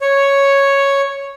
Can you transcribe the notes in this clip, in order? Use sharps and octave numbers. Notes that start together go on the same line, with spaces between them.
C#5